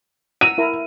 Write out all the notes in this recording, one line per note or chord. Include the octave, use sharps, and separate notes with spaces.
F#5 A#5 E6 D#7
E4 A#4 A#5